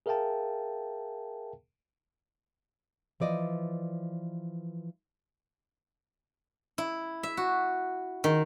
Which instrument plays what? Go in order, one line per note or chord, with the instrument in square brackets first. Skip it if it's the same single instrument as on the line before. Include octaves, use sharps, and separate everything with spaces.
[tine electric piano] G#4 A#4 E5 F5 G5 A5
[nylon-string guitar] E3 F3 D5 D#5
[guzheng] E4
E5
F#4
D#3